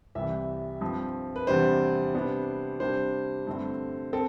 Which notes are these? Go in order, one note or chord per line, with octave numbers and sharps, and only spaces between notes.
C2 C3 E3 E5
G2 F3 C4
B4
E2 C3 G3 D4 C5
C3 G3 B3 D4
C3 G3 D4 C5
G2 D3 A3 C4
C4 A4